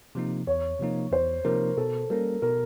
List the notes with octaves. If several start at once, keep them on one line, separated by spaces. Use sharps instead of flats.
C3 F3 A#3 D#4
E2 C#5
C3 F3 A#3 D#4
E2 C5
C3 F3 A#3 D#4 A#4
B2 A4
G3 A#3 C#4 A#4
B2 A#4